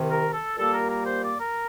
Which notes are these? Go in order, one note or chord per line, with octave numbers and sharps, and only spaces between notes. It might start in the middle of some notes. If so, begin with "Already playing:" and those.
Already playing: C2 C3 D#3
A#4
A4
A#2 G3 A#3 A4
A#4
A#4
C5
D5
A#4